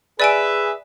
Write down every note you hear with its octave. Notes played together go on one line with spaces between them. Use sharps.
G#4 B4 D5 E5 G#5 D7